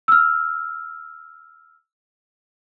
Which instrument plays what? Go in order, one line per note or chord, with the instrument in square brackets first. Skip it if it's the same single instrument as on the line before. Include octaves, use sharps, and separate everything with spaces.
[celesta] E6 F6